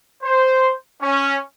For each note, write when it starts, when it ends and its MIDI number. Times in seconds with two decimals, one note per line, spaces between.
0.23 0.72 72
1.02 1.38 61